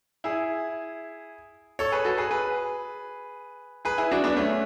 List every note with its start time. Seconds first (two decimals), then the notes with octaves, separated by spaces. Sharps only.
0.24 E4 G#4
1.79 A4 C#5
1.92 G#4 B4
2.05 F#4 A4
2.18 G#4 B4
2.31 G#4 B4
3.85 G#4 B4
3.98 E4 G#4
4.11 D4 F#4
4.24 B3 D4
4.37 A3 C#4